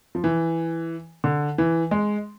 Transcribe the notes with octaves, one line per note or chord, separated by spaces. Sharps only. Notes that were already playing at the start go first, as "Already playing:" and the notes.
F3
E3
D3
E3
G#3